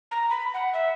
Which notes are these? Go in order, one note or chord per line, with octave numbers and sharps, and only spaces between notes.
A#5
B5
F#5
E5